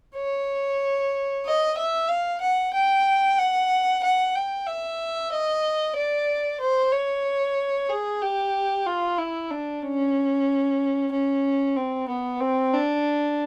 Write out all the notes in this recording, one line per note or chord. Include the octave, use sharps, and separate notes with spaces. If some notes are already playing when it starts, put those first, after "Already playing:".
C#5
D#5
E5
F5
F#5
G5
F#5
F#5
G5
E5
D#5
D5
C5
C#5
G#4
G4
F4
E4
D4
C#4
C#4
C4
B3
C4
D4